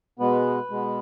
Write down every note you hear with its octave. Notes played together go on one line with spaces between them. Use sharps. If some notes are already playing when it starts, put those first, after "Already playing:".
B2 G#3 B3 B4
B2 G#3 B3